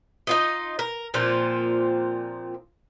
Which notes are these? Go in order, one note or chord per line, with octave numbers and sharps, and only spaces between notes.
D#4 F4 D#5
A#4
A#2 F3 C4 F4